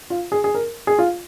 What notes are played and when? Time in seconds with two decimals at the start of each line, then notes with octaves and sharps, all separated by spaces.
0.10 F4
0.32 G#4
0.44 G#4
0.55 A#4
0.87 G#4
0.99 F4